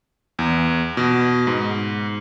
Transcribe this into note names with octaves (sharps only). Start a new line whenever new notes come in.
E2
B2
G#2